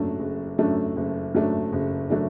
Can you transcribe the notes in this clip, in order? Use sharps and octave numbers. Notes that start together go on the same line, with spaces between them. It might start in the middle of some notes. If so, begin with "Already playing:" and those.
Already playing: F#1 F#2 F#3 A3 D4
F#1
F#2 F#3 A3 D4
F#1
F#2 F#3 A3 D4
F#1
F#3 A3 D4